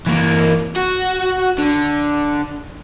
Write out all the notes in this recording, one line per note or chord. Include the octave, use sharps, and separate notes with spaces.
E3 A#3
F#4
D3